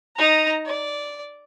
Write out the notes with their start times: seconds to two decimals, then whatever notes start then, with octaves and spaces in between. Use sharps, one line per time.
0.16 D#4 A#5
0.66 D5